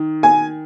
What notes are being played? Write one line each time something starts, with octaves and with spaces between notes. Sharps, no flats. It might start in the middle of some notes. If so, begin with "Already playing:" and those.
Already playing: D#3
G#5